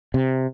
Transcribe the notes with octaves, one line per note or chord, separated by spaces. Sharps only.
C3